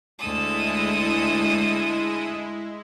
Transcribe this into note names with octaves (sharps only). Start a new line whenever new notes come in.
D2 G#3 E4 A4 D#6